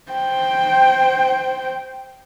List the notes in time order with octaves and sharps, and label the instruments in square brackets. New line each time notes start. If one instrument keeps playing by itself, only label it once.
[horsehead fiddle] C5 G5